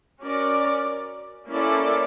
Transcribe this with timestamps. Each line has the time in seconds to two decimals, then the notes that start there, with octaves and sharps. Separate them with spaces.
0.21 C#4 F#4 A#4 D5
1.48 A#3 C#4 E4 A4 D5